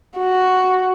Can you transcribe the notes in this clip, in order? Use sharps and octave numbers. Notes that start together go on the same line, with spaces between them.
F#4